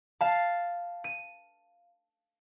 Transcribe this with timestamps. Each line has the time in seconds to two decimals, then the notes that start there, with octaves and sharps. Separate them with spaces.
0.21 F5 A5
1.04 D#7